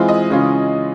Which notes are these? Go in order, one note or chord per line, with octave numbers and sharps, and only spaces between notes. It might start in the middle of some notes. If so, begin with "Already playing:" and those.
Already playing: E3 G#3 C4 F4
D#5
C#3 E3 G#3 C#4 F4